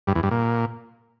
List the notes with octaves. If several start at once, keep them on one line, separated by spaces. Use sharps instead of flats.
G2
E2
G2
A#2